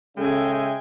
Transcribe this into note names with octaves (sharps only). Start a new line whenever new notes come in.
C#3 G#3 A4 E5 G5 G#5